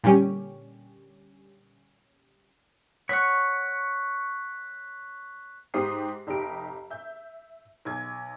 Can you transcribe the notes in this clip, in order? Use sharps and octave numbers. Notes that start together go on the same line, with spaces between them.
A#2 D3 G3 C#4 G4
C#5 F#5 C#6 F#6 B6
G#2 G4 C5 D#6 C7
F1 D#4 G4 D7
E5 G6
B1 G#6